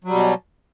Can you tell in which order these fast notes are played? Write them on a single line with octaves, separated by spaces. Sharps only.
F#3 G3 B2